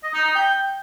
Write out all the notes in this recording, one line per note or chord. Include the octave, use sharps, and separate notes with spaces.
D#5
D#4
D#4
G5